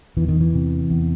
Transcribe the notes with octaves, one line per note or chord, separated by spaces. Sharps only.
E2 E3
D#3
E3
C3
E2